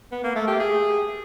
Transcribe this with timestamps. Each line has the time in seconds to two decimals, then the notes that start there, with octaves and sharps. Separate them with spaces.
0.12 B3
0.24 A#3
0.36 A3
0.48 G4
0.60 G#4